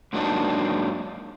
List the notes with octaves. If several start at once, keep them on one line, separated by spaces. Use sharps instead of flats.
G#2 F#3 A#3 D4 D#4